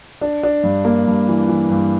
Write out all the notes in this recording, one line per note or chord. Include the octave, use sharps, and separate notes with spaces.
D4
D4
G2
A#3
G2
E3
E3
G2